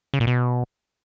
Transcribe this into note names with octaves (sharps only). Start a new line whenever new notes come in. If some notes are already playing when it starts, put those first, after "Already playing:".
C#3
A#2
B2